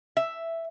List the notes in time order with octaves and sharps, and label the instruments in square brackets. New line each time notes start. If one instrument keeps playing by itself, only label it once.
[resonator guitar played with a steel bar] E5